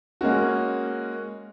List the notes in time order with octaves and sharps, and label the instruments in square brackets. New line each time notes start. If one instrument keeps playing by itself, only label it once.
[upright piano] G#3 A#3 C#4 F#4